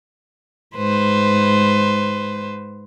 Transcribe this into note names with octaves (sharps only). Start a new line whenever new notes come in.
G#2 B4 C5